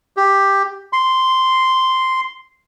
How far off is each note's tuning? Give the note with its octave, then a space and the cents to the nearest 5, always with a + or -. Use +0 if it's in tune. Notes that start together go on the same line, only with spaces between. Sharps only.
G4 +5
C6 -5